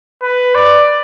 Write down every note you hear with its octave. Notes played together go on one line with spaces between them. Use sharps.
B4
D5